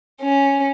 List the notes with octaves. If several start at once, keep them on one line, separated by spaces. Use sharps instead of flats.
C#4